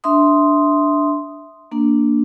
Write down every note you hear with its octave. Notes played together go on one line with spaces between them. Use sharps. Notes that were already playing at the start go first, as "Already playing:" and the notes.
D4 E5 C6 D#6
A#3 D4